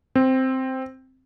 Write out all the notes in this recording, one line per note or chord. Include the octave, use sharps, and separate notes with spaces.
C4